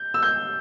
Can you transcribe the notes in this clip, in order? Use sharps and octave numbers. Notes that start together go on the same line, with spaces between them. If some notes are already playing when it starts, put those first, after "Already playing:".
Already playing: G6
E6
G6